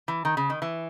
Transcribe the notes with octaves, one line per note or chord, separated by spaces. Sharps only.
E3
D#3
C#3
D#3
E3